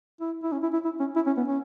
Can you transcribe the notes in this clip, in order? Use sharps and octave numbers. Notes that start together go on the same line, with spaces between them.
E4
E4
C#4
E4
E4
E4
C#4
E4
C#4
B3
C#4